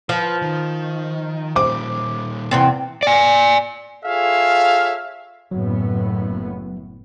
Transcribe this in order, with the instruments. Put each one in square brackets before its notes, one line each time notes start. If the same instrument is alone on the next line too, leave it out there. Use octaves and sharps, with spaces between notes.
[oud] F3 [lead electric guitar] B4
[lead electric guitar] D#3
[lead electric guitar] A#2 G3 [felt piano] C5 D6
[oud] E2 C3 C4
[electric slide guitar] D5 G#5
[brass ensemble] F4 G#4 A4 C#5 E5 F5
[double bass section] F#1 A2 B3 [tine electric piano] F#3